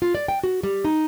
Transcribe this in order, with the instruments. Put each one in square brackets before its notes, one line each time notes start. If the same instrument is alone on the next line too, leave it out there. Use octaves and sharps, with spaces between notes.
[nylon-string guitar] F4
D5
G5
F#4
G3
D#4